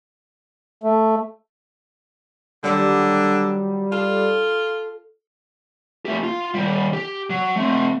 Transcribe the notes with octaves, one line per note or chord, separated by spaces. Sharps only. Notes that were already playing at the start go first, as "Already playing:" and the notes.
A3
D3 D#3 F#3 G3 G4
F4 A4
A3 G4
F4
D#3 G3
G4
F#3
A3 C4